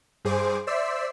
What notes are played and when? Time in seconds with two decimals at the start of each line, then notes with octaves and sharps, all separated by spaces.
0.25 G2 G#4 C5 D6
0.67 C5 D5 E5 E6 C7